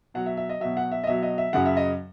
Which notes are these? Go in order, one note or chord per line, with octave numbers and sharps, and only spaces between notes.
B2 F#3 F#5
E5
E5
D#5
B2 F#3 E5
F#5
E5
D#5
B2 F#3 E5
D#5
E5
F#2 C#3 F#3 F#5
E5
D#5